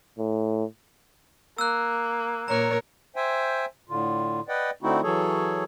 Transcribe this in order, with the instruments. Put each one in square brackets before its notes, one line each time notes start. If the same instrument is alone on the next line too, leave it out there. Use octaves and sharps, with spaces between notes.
[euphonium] A2
[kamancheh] A#3 [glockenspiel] E6 F#6
[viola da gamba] A#2 A#4 C#5 [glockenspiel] A#5 F#6
[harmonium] C5 E5 G5 G#5
A2 D3 F4
B4 D5 D#5 F#5 G5
D3 A3 C4 D#4 E4 F#4
E3 F#3 G#4 A4 C#5